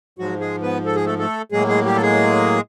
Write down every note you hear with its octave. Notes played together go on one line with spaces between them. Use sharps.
G#2 F3 F#3 G#3 F#4
G#3 G#4
B3 B4
A4
G#4
A3 A4
A3 A4
A2 F#3 G#3 A#3 G#4
G#3 G#4
G3 G4
A4
G#3 G#4